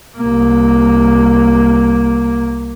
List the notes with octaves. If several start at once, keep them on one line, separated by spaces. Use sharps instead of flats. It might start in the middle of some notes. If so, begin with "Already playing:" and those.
C2 A#3